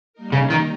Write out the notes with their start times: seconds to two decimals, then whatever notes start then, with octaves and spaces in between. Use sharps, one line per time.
0.13 G3 A#3 D#4 A#4
0.32 C#3
0.50 D#3